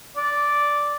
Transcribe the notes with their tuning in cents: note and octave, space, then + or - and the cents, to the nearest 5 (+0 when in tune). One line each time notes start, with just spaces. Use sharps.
D5 -5